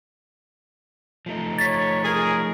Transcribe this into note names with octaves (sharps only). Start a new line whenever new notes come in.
F3 A3 D#4
C#5 A6 B6
G#4 A#4